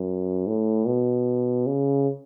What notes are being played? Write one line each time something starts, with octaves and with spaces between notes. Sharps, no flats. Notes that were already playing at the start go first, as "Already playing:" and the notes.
Already playing: F#2
A2
B2
C#3